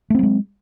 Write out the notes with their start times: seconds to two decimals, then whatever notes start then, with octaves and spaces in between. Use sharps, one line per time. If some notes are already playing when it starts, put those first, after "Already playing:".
0.10 A3
0.15 C4
0.19 F#3
0.23 G#3